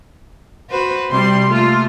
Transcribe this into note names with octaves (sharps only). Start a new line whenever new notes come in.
F#4 B4 C5
C3 G3 C6
A3 A#3 F4